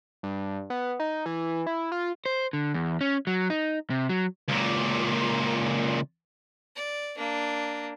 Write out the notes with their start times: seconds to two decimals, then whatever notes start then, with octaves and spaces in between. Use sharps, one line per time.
0.23 G2
0.70 B3
1.00 D#4
1.26 E3
1.67 E4
1.92 F4
2.26 C5
2.53 D3
2.74 E2
3.01 C#4
3.27 F#3
3.50 D#4
3.90 C3
4.09 F#3
4.48 C#2 A#2
6.76 D5
7.17 A#3 D4